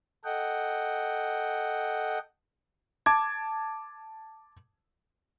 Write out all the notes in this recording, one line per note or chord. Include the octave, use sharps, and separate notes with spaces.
A4 D#5 F#5 G5
A5 D6 G#6